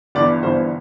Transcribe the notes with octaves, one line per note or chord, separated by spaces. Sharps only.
G1 G2 E3 D5
G1 G2 E3 C5